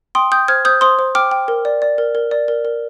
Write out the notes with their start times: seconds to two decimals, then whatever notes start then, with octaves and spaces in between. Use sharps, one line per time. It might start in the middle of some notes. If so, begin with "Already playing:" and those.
0.15 G5 C6 D#6
0.32 G5 D#6 G6
0.48 C5 F6 G#6
0.65 C5 D#6 G6
0.81 C5 C6 D#6
0.99 C5
1.15 G5 D6 F6
1.31 G5
1.48 A#4
1.65 D5
1.82 D5
1.98 A#4
2.15 A#4
2.31 D5
2.48 A#4
2.65 A#4